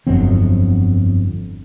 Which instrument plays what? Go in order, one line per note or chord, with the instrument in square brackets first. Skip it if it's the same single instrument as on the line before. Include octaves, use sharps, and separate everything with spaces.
[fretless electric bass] G1 F2 F#3 C4